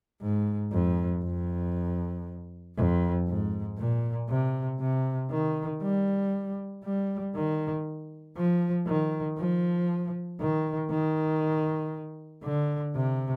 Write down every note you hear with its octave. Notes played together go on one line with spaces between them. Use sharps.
G#2
F2
F2
F2
G#2
A#2
C3
C3
D#3
G3
G3
D#3
F3
D#3
F3
D#3
D#3
D3
C3